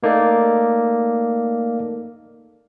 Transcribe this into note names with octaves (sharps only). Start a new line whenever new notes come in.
A3 A#3 D#4 A4 D5